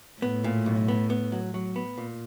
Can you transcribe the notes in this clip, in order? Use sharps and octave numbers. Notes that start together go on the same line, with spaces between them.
A2 B3
A#2
B1
B3
B3
F#3
F#3
B3
A#2